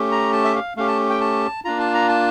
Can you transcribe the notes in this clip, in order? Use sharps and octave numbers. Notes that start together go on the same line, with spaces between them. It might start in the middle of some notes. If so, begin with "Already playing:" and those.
Already playing: A3 C#4 G4
A#5
A5
E5
F5
A3 C#4 G4 F5
A5
G5
A5
A#3 D4 F4 A#5
A5
A#5
A5